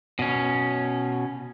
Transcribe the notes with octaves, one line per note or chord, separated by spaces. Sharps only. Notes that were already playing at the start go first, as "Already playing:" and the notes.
B2 C#4